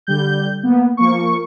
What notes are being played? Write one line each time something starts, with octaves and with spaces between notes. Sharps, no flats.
D3 G3 G6
A#3 B3
F3 A#3 C#6